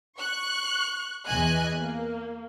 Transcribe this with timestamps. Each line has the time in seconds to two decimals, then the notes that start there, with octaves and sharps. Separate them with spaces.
0.19 C#6 F#6
1.26 E2 E3 D#5 G#5 F#6
1.79 A#3